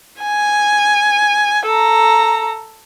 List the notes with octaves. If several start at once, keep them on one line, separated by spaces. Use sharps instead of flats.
G#5
A4 A#5